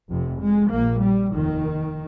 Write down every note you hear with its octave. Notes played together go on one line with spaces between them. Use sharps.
F1 F2 C3
G#3
A#1 A#2 A#3
G3
F1 D#2 D#3